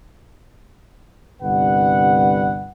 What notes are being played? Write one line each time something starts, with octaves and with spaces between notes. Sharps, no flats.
G1 C2 G3 B4 F#5